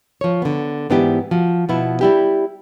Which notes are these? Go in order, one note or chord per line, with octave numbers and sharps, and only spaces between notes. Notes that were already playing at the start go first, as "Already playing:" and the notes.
F3 C#5
D3 B3
G#2 E3 B3 D4 E4 G4
F3 F#4
B2 F3 B3 E4
G3 E4 G4